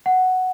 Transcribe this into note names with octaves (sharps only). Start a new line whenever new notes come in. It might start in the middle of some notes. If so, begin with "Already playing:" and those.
F#5